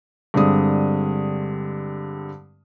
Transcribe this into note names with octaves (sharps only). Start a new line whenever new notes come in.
G2 D3 G#3 C4 D#6